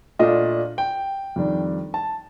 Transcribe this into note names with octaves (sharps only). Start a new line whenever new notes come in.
A#2 A3 D4 F4 D#5
G5
F2 D#3 G3 D4
A5